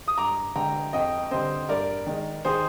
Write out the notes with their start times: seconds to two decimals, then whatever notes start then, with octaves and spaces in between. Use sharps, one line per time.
0.08 D#6
0.18 G2 A#5 D6
0.56 D3 G#3 G5 A#5
0.93 F2 D#5 G5
1.31 D3 G3 C4 C5 D#5
1.69 G2 A#4 D5
2.07 D#3 G#3
2.45 D#3 G#4 C5